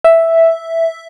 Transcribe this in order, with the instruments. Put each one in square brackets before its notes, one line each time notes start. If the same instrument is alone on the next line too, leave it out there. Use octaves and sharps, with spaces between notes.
[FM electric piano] E5